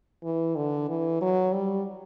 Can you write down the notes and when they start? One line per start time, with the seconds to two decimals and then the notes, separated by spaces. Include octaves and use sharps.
0.24 E3
0.56 D3
0.89 E3
1.21 F#3
1.53 G3